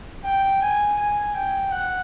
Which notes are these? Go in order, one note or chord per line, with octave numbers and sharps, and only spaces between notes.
G5
G#5
G#5
G5
F#5